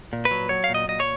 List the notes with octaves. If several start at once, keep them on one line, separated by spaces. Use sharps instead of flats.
A#2
B4
F#3
F#3 C#5
F5
A#2
D#5
A#2 D#5
C#5